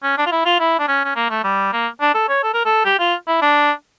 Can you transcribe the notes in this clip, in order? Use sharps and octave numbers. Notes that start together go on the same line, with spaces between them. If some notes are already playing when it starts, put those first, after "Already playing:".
C#4
D4
F4
E4
F4
E4
D4
C#4
C#4
A#3
A3
G3
A#3
D4
A4
C#5
A4
A#4
A4
G4
F4
E4
D4